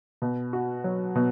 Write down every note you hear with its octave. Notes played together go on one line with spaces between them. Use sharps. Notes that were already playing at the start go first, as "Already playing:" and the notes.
B2
F#4
F#3
B2